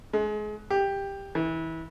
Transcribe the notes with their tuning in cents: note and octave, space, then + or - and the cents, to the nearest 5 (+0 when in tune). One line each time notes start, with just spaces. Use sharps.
G#3 +30
G4 +10
E3 -25